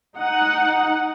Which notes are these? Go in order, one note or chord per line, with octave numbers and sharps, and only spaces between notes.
D#4 F#5